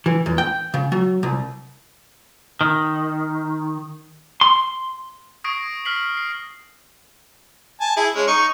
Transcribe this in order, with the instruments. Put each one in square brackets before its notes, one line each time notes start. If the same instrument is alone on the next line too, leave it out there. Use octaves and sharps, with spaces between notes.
[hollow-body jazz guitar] E3
E2
G5
C#3
F#3
C2
[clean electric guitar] D#3
C6
[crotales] C#6 D#6 G#6 A#6 C7 D7
F6 B6 C7 F#7
C7
[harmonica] G#5 A5
E4 G#4
G#3 C#4
D#4 C#6